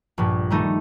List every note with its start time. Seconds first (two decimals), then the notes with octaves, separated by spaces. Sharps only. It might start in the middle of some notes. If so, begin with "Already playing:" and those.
0.18 A#1 G2 A#2
0.50 D#3 G3 A3 D#4